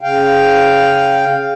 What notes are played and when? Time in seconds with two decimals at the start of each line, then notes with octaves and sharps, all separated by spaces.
0.01 C#3 F5 G5